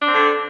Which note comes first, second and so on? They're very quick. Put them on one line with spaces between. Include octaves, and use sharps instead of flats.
D4 C4 D3